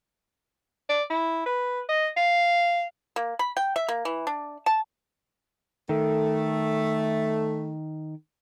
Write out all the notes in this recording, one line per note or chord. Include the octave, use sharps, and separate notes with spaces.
D5
E4
B4
D#5
F5
A#3
B5
G5
E5
A#3
E3
D4
A5
D#3 A3